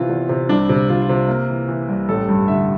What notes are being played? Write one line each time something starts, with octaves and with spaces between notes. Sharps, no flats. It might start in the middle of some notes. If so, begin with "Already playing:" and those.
Already playing: C3 E3 F4
E2
C3
C2 D4
C3
C3 F4
F4
C3
A#3
E3
E3
C2
A1 A4
G2
D3 E5